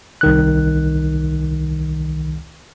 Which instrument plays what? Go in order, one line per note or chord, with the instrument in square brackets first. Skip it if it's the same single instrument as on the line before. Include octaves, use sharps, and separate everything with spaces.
[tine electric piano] C2 D#3 F#6